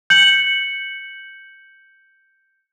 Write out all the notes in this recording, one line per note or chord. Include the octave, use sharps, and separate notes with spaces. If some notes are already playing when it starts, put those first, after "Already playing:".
G6 C#7 F#7